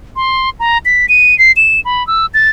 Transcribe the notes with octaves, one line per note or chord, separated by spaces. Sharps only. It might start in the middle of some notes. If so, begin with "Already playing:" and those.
C6
A#5
B6
D#7
C7
E7
B5
E6
A6